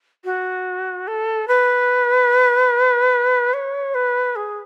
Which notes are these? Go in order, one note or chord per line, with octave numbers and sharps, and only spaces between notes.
F#4
A4
B4
C#5
B4
G#4